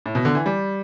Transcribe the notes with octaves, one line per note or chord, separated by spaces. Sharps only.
A2
B2
D3
E3
G3